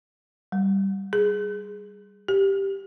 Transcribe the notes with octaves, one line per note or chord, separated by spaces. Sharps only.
G3
G#4
G4